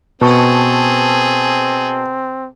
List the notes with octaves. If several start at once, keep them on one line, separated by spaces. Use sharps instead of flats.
B2 C4 G#4 A4 B4 A5 C#6